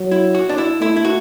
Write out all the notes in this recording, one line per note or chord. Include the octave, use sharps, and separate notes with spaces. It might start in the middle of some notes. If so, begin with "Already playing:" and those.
Already playing: F#3
E4
F#4
D4
E4
A3 E4
E4
F#4